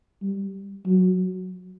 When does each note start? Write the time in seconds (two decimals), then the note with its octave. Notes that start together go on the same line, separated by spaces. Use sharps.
0.22 G3
0.86 F#3